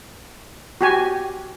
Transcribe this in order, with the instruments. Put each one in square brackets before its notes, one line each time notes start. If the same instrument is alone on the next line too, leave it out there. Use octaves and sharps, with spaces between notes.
[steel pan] F#4 G4 G#5